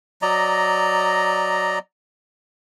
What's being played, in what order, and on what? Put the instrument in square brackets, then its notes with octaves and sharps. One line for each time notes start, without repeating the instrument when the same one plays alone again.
[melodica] F#3 D5 D#5 A#5